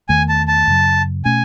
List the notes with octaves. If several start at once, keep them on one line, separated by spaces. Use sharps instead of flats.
E2 D#3 A3 G#5
A5
A5
F#2 C#3 F#3
B2 A3 C#4 G#5